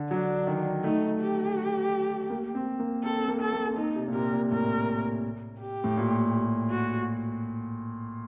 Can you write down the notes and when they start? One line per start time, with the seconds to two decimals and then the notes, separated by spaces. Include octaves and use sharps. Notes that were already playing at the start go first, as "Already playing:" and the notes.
Already playing: D3
0.11 F#3 D4
0.47 D#3
0.84 A3 D#4
1.20 G4
2.30 A#3
2.55 C4
2.80 A#3
3.04 C4 A4
3.19 C4
3.28 A#3
3.40 C4 A4
3.53 A#3
3.69 C4
3.77 A#3 D#4
3.95 C3
4.08 A#2
4.14 C3 A#4
4.33 A#2
4.51 A2 A#4
5.60 G4
5.84 A2
5.97 A#2
6.71 F#4